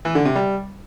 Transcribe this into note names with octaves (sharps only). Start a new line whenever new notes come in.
E3
D3
C3
G3